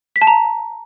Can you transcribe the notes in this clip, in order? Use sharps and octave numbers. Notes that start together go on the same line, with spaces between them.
B6
A5
A#5